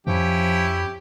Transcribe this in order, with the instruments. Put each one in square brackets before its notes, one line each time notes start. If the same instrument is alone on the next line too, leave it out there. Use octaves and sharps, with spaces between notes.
[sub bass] F2 [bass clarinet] F3 [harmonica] C#4 E4 G4